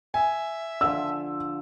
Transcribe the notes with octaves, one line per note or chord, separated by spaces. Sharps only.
E5 G#5
D3 F3 E6